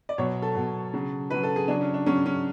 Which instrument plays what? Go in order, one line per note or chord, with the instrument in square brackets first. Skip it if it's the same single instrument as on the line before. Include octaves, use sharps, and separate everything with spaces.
[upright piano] D5
B2 F#3 C#5
A4
B2 F#3
C#3 F#3
C#3 F#3 B4
A4
G#4
C#3 F#3 D4
C#4
D4
C#3 F#3 C#4
C#4